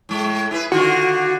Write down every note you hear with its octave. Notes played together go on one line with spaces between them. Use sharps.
A2 G#3
E4 G#4 B4
D3 D#3 F4 F#4